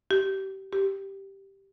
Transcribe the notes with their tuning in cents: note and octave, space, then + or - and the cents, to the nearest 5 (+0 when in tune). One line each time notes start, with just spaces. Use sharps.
G4 -25
G4 -5